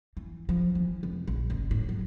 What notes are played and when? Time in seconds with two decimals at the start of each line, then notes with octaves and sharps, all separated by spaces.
0.17 E3
0.49 F3
0.75 E3
1.03 F1
1.27 A#1
1.50 F#1
1.71 A2
1.89 F#3